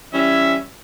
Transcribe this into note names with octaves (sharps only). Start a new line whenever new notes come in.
E3 G3 C#4 E5